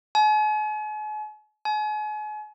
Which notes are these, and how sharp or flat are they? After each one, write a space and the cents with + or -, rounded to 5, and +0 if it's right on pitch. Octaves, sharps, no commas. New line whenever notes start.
G#5 +45
G#5 +40